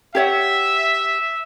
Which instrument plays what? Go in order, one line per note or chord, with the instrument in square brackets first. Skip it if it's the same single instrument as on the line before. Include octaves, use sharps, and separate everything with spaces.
[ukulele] G4 C#5 F#5 [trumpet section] E5